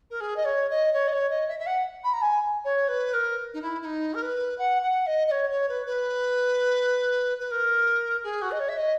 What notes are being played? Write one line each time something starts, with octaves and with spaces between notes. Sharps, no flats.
A#4
G#4
D#5
C#5
D#5
C#5
D#5
C#5
D#5
E5
E5
F#5
B5
A#5
G#5
C#5
B4
A#4
D#4
E4
E4
D#4
A#4
B4
F#5
F#5
D#5
D#5
C#5
C#5
B4
B4
B4
A#4
G#4
F#4
D#5
C#5
E5
D#5